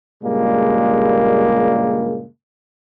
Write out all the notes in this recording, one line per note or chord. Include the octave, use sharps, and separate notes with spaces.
G2 A#2 C#3 G3 G#3 A#3